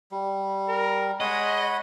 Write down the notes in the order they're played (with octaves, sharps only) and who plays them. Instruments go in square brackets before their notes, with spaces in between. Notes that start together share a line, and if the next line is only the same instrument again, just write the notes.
[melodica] G3
[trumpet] A#4
[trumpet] G#3 [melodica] C#5 F#5 B5 [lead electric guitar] D#5